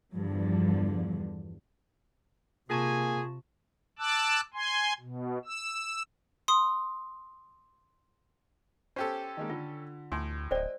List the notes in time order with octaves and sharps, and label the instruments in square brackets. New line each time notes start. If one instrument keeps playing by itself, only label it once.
[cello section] E2 G2 D3 F3
[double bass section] C3 [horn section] A#3 G#4 G#5 [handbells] F4 A5 C#6
[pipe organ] A5 D6 E6 F#6
G#5 C6
B2
E6
[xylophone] C6 D#6
[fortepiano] C#4 G4 A4 [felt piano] C5
[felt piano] D#3 G#3 A#3
[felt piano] D3 [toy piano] F4
[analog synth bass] D2 [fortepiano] A2 [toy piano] G#5 C6
[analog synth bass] D1 [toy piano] C5 D5 [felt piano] D#5 G5